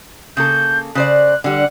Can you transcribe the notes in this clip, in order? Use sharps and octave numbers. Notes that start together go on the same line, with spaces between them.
C#3 A#3 A4 G6
C#3 C5 D5 F#6
D3 G3 F#5